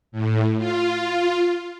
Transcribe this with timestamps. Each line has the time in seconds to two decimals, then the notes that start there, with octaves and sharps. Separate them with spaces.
0.12 A2
0.58 F4